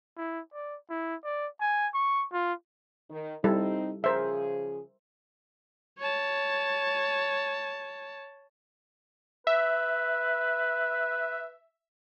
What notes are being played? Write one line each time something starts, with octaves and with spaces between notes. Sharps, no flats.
E4
D5
E4
D5
G#5
C#6
F4
D#3
G3 C4 D#4 E4 A4
C#3 F3 G#4 A#4 C5 E5
C#5 A5
B4 E5